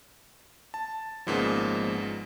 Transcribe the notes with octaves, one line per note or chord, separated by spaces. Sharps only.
A5
G#1 G#2 C#3 F3 A#3 B3